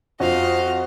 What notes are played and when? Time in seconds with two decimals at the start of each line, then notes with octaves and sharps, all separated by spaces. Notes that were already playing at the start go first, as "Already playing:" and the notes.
0.20 F2 F4 F#4 D#5 F5